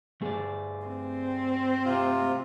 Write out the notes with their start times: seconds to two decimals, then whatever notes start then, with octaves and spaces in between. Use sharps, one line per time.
0.22 G2 A3 G#4 D5
0.88 C4
1.85 C3 F4